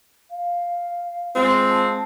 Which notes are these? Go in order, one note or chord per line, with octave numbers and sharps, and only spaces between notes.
F5
G#3 C4 F4
A5